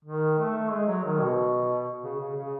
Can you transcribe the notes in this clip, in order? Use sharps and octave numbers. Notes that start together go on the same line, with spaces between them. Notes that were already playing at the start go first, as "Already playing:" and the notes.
D#3
A3
G#3
F#3
D#3
B2
C#3
C#3
C#3